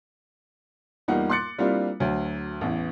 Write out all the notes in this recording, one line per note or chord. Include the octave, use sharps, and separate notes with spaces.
E2 G3 A#3 D#4 F4 F#5
C6 D6 F#6 A6 C#7
G3 A#3 C4 D4 E4 F4
D2 F#3
A1 E2 E3